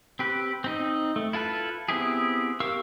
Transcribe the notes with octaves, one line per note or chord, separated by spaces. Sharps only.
C4 G4 B4
C4 D#4 D#5
A3
E4 F4 A4 B4
B3 C4 E4 G4 G#4
G4 A#4 F5 C#6 E6